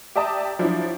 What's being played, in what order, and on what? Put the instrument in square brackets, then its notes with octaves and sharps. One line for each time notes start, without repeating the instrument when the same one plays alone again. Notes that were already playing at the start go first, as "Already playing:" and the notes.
[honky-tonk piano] G4 D5 E5 A5 A#5 D#6
F3 F#3 D4 E4